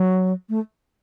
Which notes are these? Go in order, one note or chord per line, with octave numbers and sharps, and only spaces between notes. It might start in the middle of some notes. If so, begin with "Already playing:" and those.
Already playing: F#3
A3